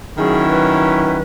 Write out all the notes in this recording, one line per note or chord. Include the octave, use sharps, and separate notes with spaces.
D#3 F#3 C#4 E4 G#4
B4
B4